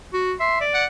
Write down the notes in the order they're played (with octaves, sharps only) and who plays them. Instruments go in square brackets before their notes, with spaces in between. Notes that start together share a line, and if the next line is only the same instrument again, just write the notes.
[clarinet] F#4
[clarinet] E5 [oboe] C6
[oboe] D5
[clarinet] F#5